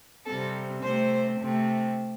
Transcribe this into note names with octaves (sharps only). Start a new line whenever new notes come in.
C3 G3 C4 A4
C3 A3 C4 C5
C3 A3 C4